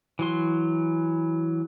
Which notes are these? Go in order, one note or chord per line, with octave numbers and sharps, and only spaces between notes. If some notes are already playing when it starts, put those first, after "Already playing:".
E3 F#3 C6